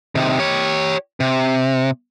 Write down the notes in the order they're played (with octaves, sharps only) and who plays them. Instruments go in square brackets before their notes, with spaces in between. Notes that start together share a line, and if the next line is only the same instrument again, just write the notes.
[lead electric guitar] C3 D#3
G4 C#5
C3